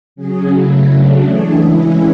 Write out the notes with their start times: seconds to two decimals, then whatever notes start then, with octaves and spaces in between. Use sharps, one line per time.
0.16 C#3 F#3 C#4 G#4
0.51 C#3 F#3 A3 E4
0.86 C#3 F#3 A3 D4
1.22 E3 A3 D4 G#4
1.57 E3 G#3 C#4 E4